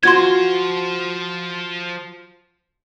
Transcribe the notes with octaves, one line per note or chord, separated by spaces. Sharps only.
F3 F4 F#4 C5 F5 C6 G#6